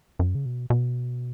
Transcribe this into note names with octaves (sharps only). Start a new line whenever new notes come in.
F#2
C#3
B2
B2